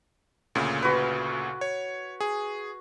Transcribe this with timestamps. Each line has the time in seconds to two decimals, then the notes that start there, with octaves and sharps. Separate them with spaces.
0.55 D2 A#2 C#3
0.82 F#4 B4
1.61 C#5
2.20 G#4